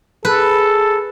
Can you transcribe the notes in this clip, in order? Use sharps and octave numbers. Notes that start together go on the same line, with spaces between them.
G#4 A4 B4